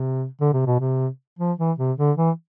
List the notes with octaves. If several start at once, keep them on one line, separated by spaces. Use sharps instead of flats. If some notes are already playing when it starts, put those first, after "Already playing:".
Already playing: C3
D3
C3
B2
C3
F3
E3
C3
D3
E3